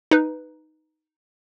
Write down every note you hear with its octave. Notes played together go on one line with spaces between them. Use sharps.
D#4 B4